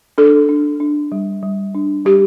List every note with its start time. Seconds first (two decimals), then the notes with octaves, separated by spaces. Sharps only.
0.18 D4 A4
0.49 D4
0.80 D4
1.12 G3
1.43 G3
1.75 D4
2.05 G3 G4